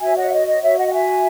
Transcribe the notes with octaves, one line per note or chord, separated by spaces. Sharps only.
F#4 C#5 E5 G#5
D#5 F#5
E5
D#5
D#5
C#5 E5
D#5 F#5
F#5
E5 G#5